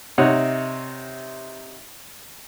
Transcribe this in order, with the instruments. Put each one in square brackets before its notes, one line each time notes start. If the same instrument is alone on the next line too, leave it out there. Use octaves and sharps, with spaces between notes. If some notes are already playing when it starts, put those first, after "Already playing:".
[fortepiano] C3 D#4 C#5 F#5